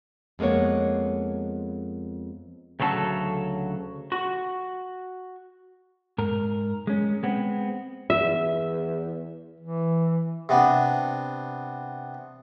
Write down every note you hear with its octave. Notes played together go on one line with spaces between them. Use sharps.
F2 G#3 A#3 B3 C#5
D2 C#3 F#3 A4 A5
F#4
G#2 A#4
G#3 C#4
G#3 B3 C4
E2 E5
E3
C3 B3 D4